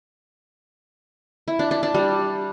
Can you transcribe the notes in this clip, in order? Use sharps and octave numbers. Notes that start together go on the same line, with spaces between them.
E4
D4
D4
D4
G3